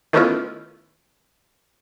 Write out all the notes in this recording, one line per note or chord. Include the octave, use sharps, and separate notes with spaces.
D#3 A3 B3 C#4 E4 F4